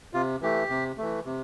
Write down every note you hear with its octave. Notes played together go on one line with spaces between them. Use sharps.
C3 F4
E3 A3 G4
C3
E3 A3
C3